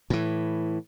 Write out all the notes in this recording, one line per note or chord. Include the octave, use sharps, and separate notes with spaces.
A2 E3